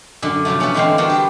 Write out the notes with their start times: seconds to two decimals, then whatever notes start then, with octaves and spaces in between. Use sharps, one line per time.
0.22 F#2 D3
0.45 C3 F3 F#3 A3
0.60 B3 C#4 E4 A4 B4
0.74 D3 E3 G#3 C4 C5 F5
0.98 G3 B3 D4 F#4 G4 A#4
1.10 G4 B4 C5